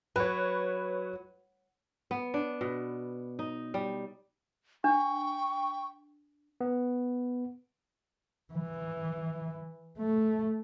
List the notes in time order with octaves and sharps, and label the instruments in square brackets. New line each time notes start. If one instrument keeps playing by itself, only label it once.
[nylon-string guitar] F#3 [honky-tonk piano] B4 C#5
[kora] B3
D4
B2
D#4
G3
[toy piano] D4 [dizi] G5 [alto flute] C#6
[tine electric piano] B3
[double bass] E3
A3